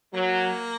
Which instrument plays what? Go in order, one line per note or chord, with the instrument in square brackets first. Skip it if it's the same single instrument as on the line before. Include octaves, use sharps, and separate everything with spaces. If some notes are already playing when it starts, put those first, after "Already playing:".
[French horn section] F#3 [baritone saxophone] A#3